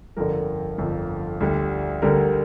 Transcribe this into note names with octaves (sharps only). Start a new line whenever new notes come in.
G1 F2 D3 A#4
G1 F2 D3
D2 D3 G3
D2 D3 G3 A#4